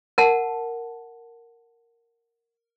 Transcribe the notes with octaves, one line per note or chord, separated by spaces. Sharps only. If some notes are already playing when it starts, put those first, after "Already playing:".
A#4 F#5 A5